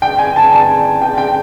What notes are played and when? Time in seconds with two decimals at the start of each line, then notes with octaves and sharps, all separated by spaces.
0.02 G5
0.19 G#5
0.36 A5
0.53 A5
1.02 G5
1.18 G5